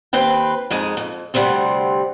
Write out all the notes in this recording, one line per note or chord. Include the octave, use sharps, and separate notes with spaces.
D#2 C4 B4 G5
F2 G#3 D#4
F2
D2 C3 G3 C4 F#5